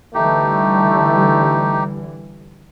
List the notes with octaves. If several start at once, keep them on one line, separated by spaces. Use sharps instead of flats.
D3 E3 G3 A3 D#4 G4